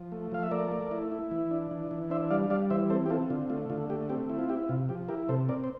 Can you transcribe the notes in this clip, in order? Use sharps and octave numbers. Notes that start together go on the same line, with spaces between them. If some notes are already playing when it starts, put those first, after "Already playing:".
Already playing: F3
A3
F3 F5
E5
A3 A#4 D5
A3
E4
E4
E3
D4
E3
E3
D4 C5 E5
G3 D5 F5
G3 D5 F5
E3 C5 E5
C4 A4 C5
G4
C4 F4 A4
D3 F4
A3 F4
D3 F4
A3 G4
C4 G4
E4
F4
E4 G4
C3 F4
F3 G4
E4 G4 A#4
C3 A4 C5
C4 A#4 D5
C5